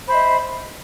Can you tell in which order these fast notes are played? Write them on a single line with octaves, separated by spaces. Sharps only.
C5 B5 E5 D#5